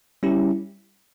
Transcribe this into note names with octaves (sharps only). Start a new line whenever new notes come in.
G3 C#4 E4 G4